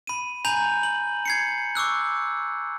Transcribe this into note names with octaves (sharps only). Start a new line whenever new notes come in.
B5 D#7
G#5 A#5 B5 G6 F7
F#7
G#6 C7 C#7
C#6 D6 E6 F#6